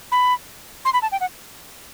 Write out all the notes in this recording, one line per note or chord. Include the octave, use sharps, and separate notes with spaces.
B5
C6
B5
A5
G5
F#5